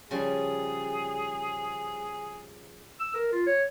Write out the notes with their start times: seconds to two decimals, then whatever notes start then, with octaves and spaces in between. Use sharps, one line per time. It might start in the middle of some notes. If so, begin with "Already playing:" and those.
0.11 C#3 F3 G3 G#4
3.00 E6
3.14 A#4
3.32 F4
3.46 C#5